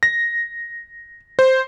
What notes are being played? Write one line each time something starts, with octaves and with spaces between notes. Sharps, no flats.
A#6
C5